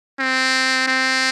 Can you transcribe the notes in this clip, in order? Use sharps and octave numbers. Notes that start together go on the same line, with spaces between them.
C4
C4